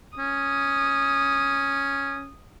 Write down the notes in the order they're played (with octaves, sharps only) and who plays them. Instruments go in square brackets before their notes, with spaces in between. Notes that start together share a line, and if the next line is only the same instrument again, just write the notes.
[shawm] C#4 [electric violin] D#6